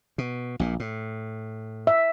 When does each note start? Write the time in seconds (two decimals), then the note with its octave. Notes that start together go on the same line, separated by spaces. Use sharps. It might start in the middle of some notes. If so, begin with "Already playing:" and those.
0.18 B2
0.59 A#1 A#2
0.80 A2
1.87 E5